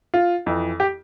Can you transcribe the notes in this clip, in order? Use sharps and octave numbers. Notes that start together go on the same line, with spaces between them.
F4
F2 E3
G4